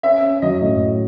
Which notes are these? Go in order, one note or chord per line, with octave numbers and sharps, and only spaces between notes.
C#4 E5
C#4
F#3 D#5
A2